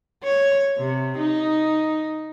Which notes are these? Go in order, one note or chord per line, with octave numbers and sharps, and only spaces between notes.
C#5
C3
D#4